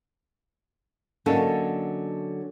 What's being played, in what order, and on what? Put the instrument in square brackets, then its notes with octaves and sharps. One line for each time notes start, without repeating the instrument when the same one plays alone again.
[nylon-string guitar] D3 F#3 A#3 C#4 D#4 A4